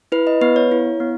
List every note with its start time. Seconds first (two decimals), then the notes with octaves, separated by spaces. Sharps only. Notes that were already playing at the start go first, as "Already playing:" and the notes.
0.12 E4 B4
0.27 D#5
0.41 B3 B4
0.56 C#5
0.71 E4
1.00 B3